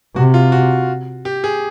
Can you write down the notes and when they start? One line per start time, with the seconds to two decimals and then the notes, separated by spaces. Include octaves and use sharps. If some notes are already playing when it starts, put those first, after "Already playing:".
0.16 C3 F#4
0.34 F4
0.52 F#4
1.25 G4
1.44 G#4